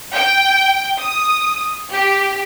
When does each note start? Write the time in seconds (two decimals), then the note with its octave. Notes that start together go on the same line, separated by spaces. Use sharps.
0.15 G5
1.00 D#6
1.92 G4